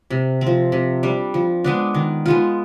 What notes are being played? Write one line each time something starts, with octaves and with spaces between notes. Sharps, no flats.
C3
C4
F3
C3
G3 D4
F3
G#3 B3 D4
D#3
G#3 B3 F4